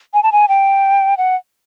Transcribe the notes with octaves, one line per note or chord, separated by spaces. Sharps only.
G#5
A5
G#5
G5
F#5